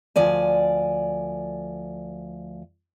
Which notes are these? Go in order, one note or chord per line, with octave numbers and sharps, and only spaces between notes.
D2 F3 D5 G#5